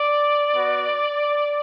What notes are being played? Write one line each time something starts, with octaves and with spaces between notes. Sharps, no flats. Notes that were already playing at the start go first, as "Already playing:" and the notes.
Already playing: D5
B3 F#4